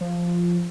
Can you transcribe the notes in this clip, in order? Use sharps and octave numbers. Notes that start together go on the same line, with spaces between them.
F3